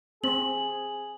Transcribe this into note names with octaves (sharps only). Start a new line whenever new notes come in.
C4 G#4 F#7